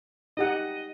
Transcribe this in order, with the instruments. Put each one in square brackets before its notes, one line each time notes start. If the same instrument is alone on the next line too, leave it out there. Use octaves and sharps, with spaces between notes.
[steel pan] D#4 G4 F#5 [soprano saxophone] D#5